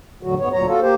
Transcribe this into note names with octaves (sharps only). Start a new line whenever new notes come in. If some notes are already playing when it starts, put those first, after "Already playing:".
E2 A2 D3 F#3 F#4
G#2 B3 C#5
D2 A#2 F#3 C#5 A#5
F4 F#4 A4
A#3 G4 C5